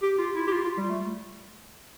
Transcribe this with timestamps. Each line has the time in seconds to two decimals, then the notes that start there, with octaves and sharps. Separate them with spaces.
0.02 G4
0.18 F4
0.35 E4
0.47 G4
0.52 F4
0.64 F4
0.77 G3
0.89 A3